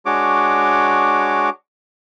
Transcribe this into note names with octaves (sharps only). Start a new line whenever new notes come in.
G#3 D4 F#4 C#5 D6